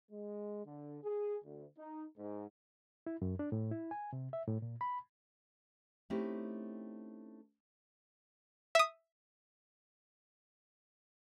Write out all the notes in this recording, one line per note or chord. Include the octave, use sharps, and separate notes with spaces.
G#3
D3
G#4
D2
D#4
G#2
E4
F#2
D4
A2
E4
G#5
C3
E5
A2
A#2
B5
A3 C4 C#4 D#4 E4 G4
E5 D#6